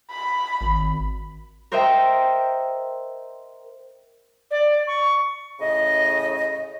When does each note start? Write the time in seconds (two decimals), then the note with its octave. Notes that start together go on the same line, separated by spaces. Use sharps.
0.11 B5
0.61 G#1
1.72 A#4 C5 D#5 E5 G5
4.51 D5
4.87 C#6
5.60 A2 C#3 D#5